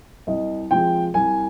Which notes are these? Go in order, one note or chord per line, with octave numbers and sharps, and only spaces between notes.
C2 D#5
C3 F3 G#3 G5
C2 G#5